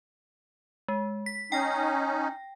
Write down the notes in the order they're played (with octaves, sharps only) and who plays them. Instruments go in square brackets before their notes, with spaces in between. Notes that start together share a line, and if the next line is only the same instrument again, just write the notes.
[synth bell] G#3
B6
[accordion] C#4 D#4 [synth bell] G5 A#6